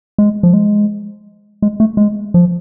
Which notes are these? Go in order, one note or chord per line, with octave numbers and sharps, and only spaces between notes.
G#3
F3
G#3
G#3
A3
G#3
F3